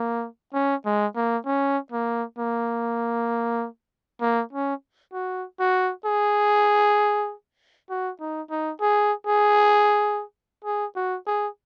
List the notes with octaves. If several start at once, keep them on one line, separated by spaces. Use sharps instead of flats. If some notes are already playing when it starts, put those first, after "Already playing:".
Already playing: A#3
C#4
G#3
A#3
C#4
A#3
A#3
A#3
C#4
F#4
F#4
G#4
F#4
D#4
D#4
G#4
G#4
G#4
F#4
G#4